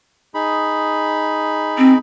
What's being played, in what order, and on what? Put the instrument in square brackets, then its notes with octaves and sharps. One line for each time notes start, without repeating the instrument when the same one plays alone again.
[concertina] D#4 G#4 B5
[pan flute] C4